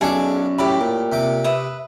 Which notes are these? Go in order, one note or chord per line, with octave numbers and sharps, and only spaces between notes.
B1 F#2 D4 G#4 A4 G#5 D6
A2 G4 D5 B5
A#2 G4
C3 D6
B4 E5 D#6